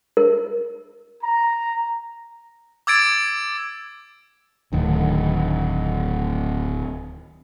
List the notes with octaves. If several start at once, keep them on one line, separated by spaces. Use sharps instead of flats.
A#4
A#5
D6 E6 G#6 A6 D7
D1 D#3